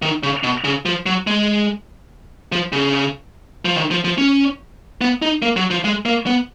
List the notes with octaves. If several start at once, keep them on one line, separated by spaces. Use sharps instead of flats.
D#3
C#3
B2
C#3
F3
F#3
G#3
F3
C#3
F3
D#3
F3
F3
C#4
B3
D#4
A#3
F#3
F3
G#3
A#3
B3